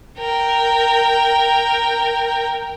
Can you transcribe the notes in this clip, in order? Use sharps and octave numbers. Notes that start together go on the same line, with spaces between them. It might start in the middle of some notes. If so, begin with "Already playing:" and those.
A#4 G5